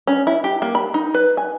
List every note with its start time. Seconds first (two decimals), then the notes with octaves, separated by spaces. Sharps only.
0.07 C#4
0.27 E4
0.44 G4
0.62 A#3
0.75 B5
0.94 D#4
1.14 B4
1.37 G#5